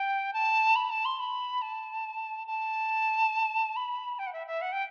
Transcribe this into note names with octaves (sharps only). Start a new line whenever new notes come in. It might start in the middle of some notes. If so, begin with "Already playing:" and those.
Already playing: G5
A5
B5
A5
C6
B5
A5
A5
B5
G5
F#5
E5
E5
F#5
G5